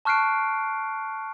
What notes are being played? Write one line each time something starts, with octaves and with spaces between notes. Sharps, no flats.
A5 C#6 F6 F#6 C7 D7